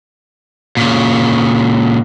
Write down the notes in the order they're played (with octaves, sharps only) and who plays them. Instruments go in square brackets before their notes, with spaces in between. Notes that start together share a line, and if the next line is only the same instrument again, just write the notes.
[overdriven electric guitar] A#2 C#3